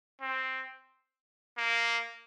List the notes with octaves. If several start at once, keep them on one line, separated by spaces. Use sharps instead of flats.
C4
A#3